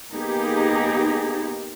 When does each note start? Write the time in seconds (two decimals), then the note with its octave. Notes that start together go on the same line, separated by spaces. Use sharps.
0.11 A#3 B3 D#4 G4 G#4